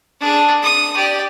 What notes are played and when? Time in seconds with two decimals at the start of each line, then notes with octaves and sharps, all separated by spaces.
0.20 D4 G#4
0.63 D#6
0.95 G4 D5